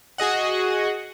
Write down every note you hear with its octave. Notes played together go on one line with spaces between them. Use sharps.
F#4 G#4 D#5 F#5